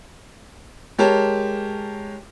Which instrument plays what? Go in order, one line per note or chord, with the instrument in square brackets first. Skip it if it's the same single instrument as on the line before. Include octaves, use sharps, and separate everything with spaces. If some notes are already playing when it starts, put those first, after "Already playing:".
[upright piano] G#3 G4 A#4 C#5 A5